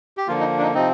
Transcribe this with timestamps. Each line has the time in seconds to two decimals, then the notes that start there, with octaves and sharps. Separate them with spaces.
0.17 G4
0.28 D3 F3 A#3 F4
0.39 D#4
0.58 D4
0.62 D#4
0.74 C3 F3 C4 D#4